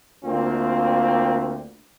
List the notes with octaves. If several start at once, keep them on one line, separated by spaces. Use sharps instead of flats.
D2 A#3 C4 F4